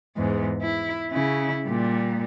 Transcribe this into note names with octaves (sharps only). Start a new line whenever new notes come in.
E2 G#2
E4
C#3 E4
A#2 G3